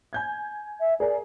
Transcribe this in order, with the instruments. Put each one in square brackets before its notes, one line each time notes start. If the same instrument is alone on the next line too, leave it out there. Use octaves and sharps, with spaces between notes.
[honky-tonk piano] G#5 G6 G#6
[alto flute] E5
[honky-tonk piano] G#4 A#4 [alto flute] D5